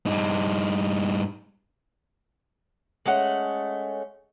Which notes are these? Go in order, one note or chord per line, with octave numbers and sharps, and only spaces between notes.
G2 D#4
G#3 A3 C#4 F#5